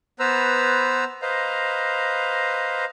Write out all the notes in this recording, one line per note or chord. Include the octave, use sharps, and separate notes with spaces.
B3 B4 C5 A#5 E6
B4 C5 D#5 F5 A#5